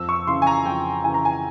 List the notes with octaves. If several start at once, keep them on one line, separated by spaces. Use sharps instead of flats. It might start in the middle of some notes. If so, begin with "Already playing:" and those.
Already playing: F2 E6
C#6
C#3 E3 C6
G#5
A#5
F2 G5
C#3 E3 G#5
A#5
G#5